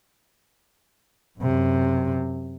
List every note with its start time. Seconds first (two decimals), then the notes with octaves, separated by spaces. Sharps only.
1.39 F#2 C3